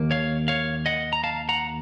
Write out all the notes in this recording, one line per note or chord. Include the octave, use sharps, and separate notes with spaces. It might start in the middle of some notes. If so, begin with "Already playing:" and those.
Already playing: D#2 D#3 A#3
C#5 F5
C#5 F5
D#5 F#5
A#5
F5 A5
F#5 A#5